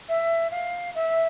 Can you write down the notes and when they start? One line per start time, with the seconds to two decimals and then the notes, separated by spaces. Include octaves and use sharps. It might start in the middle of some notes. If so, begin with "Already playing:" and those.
0.09 E5
0.51 F5
0.95 E5